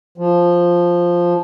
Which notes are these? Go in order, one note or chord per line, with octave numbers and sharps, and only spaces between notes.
F3